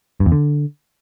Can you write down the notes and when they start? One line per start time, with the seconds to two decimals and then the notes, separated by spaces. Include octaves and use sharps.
0.20 G2
0.26 E2
0.32 D3